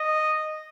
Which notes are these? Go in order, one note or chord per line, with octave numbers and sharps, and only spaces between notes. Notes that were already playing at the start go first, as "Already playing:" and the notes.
Already playing: D#5